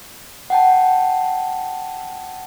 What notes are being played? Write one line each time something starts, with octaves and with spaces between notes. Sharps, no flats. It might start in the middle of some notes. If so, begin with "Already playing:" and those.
F#5 G5 A5